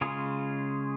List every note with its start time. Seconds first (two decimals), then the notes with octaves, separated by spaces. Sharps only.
0.01 C#3 G#3 C#4 F4 G#4